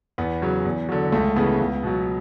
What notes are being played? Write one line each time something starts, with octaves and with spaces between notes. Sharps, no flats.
E2 B3
C#3 F#3
E2
D3 F#3
C#2 A3
C#3 E3 B3
C#2
B2 F#3